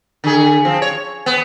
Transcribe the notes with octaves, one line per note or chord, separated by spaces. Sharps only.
D3 G#4
F3 C4
C#5
B3